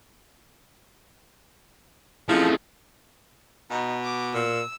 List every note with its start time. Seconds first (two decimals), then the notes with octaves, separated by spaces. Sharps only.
2.29 F3 G#3 A3 C4 C#4 E4
3.71 B2 D#4
4.04 D6
4.34 A#2 E6